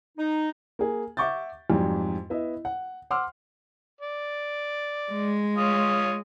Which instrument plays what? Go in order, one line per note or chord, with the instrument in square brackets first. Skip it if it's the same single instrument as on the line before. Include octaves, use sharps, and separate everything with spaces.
[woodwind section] D#4
[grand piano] A#3 G#4
E5 F#5 C#6 D6 G6 A6
F2 G#2 F#3 G3
B3 E4 D#5 E5
F#5
F#5 C6 D6 E6 F6
[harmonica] D5
[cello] G#3
[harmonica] F4 C#5 D#6